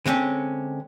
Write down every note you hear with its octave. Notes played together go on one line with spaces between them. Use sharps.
D3 G#3 C4 C#4